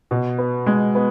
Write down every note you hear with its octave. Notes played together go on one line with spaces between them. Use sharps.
B2
B3
G#3
B3